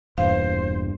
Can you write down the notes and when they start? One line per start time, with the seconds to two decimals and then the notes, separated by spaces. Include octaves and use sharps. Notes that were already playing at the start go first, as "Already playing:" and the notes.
0.18 E1 E2 G2 A#2 C5 F5